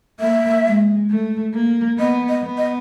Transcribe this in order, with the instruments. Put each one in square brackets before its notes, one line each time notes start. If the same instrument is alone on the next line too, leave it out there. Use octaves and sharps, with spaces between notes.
[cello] A#3 [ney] E5
[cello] G#3
A3
A#3
[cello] B3 [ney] D#5
[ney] D#5
[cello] B3
[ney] D#5